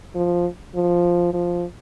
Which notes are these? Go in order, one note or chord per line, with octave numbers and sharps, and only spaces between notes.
F3
F3
F3